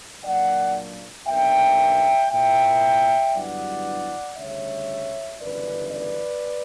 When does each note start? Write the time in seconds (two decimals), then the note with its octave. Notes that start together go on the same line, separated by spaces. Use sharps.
0.24 A#2 F#3 A#3 D4 D5 F#5
1.27 B1 B2 A#3 D4 E5 G5
2.31 A#2 A#3 E4 E5 G5
3.33 G1 G2 F#3 B3 E4 D5 F#5
4.37 D2 C#3 G3 C#5 E5
5.40 G1 F#2 C#3 E3 B4 D5
5.92 B4 D5